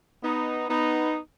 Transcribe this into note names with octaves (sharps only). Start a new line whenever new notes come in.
B3 D#4
B3 D#4